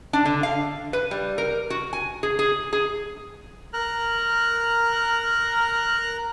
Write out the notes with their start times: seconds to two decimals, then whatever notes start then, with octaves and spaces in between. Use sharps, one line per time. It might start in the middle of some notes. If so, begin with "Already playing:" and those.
0.13 D4
0.25 D3
0.43 F5
0.93 B4
1.11 G3
1.38 A#4
1.70 F#4
1.93 G#5
2.23 G#4
2.39 G#4
2.73 G#4
3.73 A#4 A#5 F6 F#6